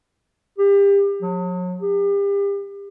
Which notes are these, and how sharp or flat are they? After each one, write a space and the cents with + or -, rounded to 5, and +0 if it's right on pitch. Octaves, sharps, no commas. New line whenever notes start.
G4 +30
F#3 -40
G4 +35